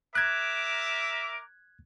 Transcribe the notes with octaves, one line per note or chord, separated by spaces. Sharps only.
A#4 E5 D6 F#6 G#6